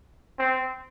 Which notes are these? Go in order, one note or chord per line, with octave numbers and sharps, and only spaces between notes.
C4